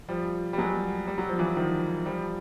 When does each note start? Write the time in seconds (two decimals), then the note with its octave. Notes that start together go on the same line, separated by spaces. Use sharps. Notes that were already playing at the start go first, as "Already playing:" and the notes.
0.09 F3 G3
0.53 G3
0.58 F#3 G#3
1.07 G3
1.18 F#3
1.29 F3
1.39 E3 F#3
1.57 D#3 F3
2.06 F3 G3